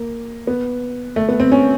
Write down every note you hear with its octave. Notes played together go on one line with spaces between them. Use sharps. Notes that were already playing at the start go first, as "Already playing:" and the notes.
Already playing: A#3
B3
A3
B3
C4
C#4